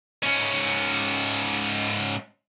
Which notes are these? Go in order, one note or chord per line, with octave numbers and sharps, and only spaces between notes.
G#2 C#4